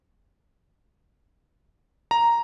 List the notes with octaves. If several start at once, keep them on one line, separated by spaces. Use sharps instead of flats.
A#5